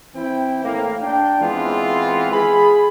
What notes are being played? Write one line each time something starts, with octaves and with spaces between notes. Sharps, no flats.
E3 C4 E4 G5
A2 A#3
D4 G5
E3 G#3 B3 C4 F4
G#4 B5